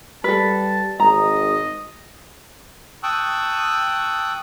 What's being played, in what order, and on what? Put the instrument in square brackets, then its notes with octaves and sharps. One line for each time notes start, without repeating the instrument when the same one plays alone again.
[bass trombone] G3 [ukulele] A4 B4 [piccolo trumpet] A5
[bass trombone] G#1 [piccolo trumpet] D#5 [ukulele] A#5
[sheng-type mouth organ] G5 A5 C#6 D#6 E6 F#6